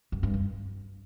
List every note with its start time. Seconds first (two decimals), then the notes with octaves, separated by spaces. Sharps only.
0.12 F#2
0.23 G2
0.34 F#2